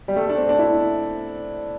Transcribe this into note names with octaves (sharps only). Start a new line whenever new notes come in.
G3
A3
D4
C4
D4
E4